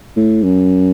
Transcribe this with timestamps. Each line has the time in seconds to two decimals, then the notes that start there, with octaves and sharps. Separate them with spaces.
0.17 A2
0.43 F#2